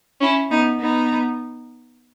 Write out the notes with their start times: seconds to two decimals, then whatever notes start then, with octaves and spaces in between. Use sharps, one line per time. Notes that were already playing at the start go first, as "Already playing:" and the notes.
0.21 C#4 E4
0.50 B3 D#4
0.79 B3 D#4